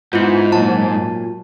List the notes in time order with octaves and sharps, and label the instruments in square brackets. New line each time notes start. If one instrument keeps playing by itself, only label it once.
[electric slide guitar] G#2 [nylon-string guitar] B3 [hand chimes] E4 F4
[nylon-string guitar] A#2 F#3 [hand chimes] A5